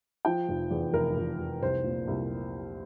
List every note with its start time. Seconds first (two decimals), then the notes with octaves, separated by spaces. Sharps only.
0.25 F3 G5
0.49 F1
0.71 E2
0.93 F1 A#4
1.17 F1
1.39 F1
1.61 C2 C5
1.84 A#2
2.08 C2